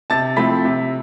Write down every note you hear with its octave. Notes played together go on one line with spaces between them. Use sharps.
C3 A5 A6
F3 A3 C4 E4 B5 B6
C3